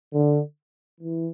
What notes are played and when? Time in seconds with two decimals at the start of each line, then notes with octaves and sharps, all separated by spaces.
0.13 D3
1.01 E3